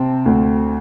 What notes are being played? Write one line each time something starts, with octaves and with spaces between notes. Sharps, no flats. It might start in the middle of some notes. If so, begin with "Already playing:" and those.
Already playing: C3 C4 A5
D2